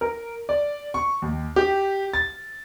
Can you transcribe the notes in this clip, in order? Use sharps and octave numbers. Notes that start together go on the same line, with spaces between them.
A#4
D5
C#6
D#2
G4
A6